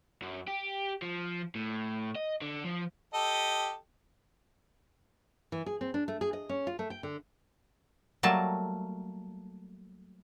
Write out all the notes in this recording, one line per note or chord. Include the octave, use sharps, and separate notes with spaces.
F#2
G4
F3
A2
D#5
D3
F3
G4 A4 D#5
E3
G#4
C4
D4
A3
G#4
D#5
C#4
F4
A3
G5
D3
F#3 G3 A3 A#3 A5